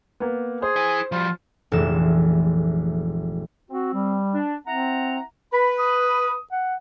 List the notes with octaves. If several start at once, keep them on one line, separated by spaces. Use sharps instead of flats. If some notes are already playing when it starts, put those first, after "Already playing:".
A#3 B3
G#4 C5
E4 G#5
F3 G3 F4
F1 A#1 E3 G#3 A3 E7
C4 F#4
G3
D4
C4 E4 F#5 A#5
B4 B5
D#6
F#5